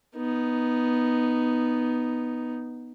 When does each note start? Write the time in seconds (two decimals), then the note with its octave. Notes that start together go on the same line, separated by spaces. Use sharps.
0.16 B3 D#4